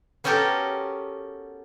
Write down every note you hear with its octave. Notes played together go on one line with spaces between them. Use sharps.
B3 C#4 F#4 G4 A4 A#4